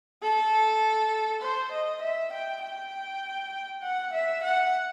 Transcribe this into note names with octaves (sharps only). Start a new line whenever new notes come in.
A4
C5
D#5
E5
G5
G5
F#5
E5
F#5